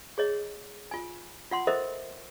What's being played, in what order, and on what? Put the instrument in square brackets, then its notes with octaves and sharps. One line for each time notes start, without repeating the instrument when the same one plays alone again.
[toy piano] G#4 C#5 D#5
F4 G#5
F4 F#5 C6
A4 A#4 C5 D#5 E5